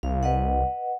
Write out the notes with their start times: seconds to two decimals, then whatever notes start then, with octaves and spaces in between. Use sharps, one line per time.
0.03 C2 F5
0.23 B4 D#5 F#5